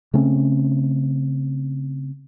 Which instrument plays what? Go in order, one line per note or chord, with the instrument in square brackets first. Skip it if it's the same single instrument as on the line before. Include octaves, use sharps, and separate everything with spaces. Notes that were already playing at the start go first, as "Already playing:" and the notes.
[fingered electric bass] C#3 A3 C4 C#4